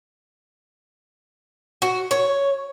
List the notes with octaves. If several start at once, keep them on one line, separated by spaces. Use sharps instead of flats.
F#4
C#5